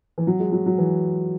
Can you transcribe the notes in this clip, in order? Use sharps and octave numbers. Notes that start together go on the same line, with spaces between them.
E3
F#3
G#3
F#3
F#3
E3